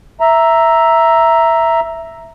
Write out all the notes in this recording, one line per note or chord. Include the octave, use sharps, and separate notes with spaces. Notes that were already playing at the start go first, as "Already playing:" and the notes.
E5 A#5